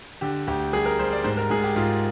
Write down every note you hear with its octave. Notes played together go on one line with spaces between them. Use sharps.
D3 G4
D2 G4
G3 G#4
A#4
G3 C5
D5
G#2 C5
A#4
G#2 G#4
G4
G#2 F4